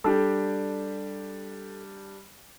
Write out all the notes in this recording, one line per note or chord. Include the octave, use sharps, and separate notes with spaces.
G3 D4 G4 A4